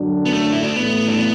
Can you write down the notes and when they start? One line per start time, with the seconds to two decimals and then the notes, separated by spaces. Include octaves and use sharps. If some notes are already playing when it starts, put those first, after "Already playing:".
Already playing: F#2 D3 F#3 D4
0.26 B3
0.33 A3
0.52 E4
0.64 D4
0.75 A1 A2 A3 B3
1.08 D4
1.18 B3